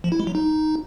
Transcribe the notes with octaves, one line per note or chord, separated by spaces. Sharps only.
F3
E4
G#3
F#3
D#4